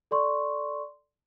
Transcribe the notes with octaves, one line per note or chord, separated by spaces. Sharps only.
A4 D5 C6 C#6